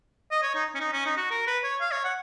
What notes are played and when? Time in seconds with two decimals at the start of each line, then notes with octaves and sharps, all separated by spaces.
0.32 D#5
0.43 C#5
0.55 D#4
0.75 C#4
0.80 D#4
0.93 C#4
1.06 D#4
1.17 F#4
1.31 A#4
1.47 B4
1.64 C#5
1.81 F5
1.92 C#5
2.05 F#5